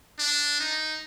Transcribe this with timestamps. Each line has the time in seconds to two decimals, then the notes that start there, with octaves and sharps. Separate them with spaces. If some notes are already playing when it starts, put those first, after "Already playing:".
0.19 D4
0.60 D#4